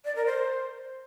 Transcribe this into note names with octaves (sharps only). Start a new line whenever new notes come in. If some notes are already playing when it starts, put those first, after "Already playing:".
D5
A#4
C5